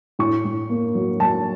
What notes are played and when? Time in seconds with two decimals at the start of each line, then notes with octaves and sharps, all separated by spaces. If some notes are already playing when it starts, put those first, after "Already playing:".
0.19 A2 C#6
0.45 A2
0.69 A#3
0.95 F#3
1.20 F#3 A5